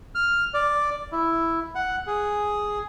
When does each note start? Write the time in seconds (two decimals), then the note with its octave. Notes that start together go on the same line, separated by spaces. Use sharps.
0.15 F6
0.54 D5
1.12 E4
1.75 F#5
2.07 G#4